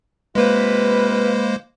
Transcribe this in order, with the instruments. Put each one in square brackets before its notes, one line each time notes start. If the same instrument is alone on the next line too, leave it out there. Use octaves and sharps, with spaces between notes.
[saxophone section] C3 F4 B4 [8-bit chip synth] G#3 A#3 C5